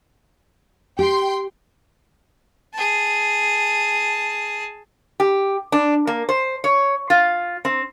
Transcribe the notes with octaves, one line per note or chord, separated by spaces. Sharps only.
G4 G5 C6
G#4 A5
G4
D4
A#3
C5
C#5
F4
C4